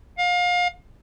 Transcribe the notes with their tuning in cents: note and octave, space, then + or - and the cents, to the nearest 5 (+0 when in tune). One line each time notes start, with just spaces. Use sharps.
F5 +30